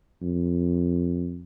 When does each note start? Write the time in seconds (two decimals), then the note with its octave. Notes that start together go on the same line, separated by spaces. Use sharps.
0.23 F2